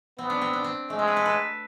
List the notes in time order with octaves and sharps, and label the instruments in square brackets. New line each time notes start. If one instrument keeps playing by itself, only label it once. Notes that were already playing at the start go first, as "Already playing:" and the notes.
[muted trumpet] B3 [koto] C4
[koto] D4
C4
D4
C4
[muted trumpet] G#3 [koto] A3
[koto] C4
B4
A4
B4